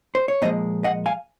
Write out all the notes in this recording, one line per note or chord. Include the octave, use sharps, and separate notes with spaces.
C5
C#5
A#2 F3 G#3 C5 D#5
D#5 F#5
F5 G#5